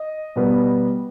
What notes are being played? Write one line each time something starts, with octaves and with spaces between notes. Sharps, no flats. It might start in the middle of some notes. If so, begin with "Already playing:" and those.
Already playing: D#5
B2 G3 B3